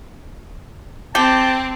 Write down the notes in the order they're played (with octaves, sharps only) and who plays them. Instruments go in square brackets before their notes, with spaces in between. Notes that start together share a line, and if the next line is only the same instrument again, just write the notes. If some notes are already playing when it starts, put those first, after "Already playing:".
[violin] C4 [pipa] G4 [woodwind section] A5